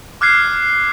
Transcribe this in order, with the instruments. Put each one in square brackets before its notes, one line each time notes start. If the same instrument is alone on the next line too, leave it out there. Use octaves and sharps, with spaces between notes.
[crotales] D6 F6 F#6 G#6 C7